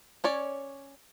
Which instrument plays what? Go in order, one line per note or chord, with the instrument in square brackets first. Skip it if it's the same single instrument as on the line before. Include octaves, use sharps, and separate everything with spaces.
[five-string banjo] C#4 C#5 D5